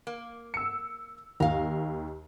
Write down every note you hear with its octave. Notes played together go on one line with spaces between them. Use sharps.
A#3
E6 C#7
D#2 A#4 F5